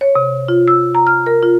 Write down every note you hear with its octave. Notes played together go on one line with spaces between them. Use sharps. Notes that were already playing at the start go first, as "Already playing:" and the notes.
C#5
C3
F4
E6
A#5
F6
A#4
F4